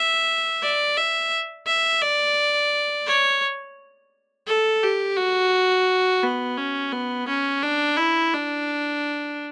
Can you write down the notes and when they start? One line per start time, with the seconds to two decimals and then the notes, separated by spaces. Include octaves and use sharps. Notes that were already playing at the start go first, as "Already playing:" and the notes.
Already playing: E5
0.62 D5
0.97 E5
1.67 E5
2.02 D5
3.07 C#5
4.47 A4
4.83 G4
5.17 F#4
6.23 B3
6.57 C#4
6.92 B3
7.28 C#4
7.62 D4
7.97 E4
8.33 D4